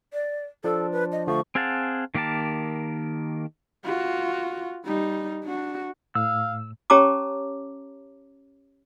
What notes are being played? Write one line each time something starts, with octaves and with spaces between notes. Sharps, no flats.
D5
F3 D4 A4
B4
D#5
D3 F3 A3 C#6
C4 G#4 F5 F#5 A5
D#3 A#3 G4 A#4 A5
F4 F#4
G3 D#4
D4 F#4
A2 F5 E6
C#4 G4 C#5 A5 A#5 D6